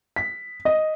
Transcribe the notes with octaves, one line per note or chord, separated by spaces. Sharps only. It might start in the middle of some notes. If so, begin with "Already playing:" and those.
B6
D#5